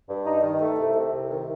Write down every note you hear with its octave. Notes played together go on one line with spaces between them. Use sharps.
G2
D#4
D#3
A3
C2
C3
C2
D#3